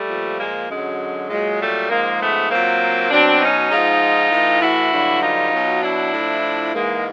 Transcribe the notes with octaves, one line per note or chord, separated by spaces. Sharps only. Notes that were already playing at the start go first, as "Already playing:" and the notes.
Already playing: G3 A3
A#2 F3
G#3 A#3
F#2 D3 F#3 G#3
A#2 F#3 G#3
G3 A3
G#2 F3 G#3 A#3
A3 B3
A#2 F#3 A#3 C4
B2 F#3 C4 D4
C#4 D#4
G#2 F3 D#4 F4
A2 E3
E4 F#4
G2 D3 F#3
D#4 F4
B2 F#3
D4 E4
A2 F3
G#2 E3 G#3 A#3